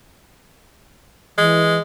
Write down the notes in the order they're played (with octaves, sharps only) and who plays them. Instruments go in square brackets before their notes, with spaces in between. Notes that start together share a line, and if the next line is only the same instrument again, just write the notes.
[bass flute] E3 [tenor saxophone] G#3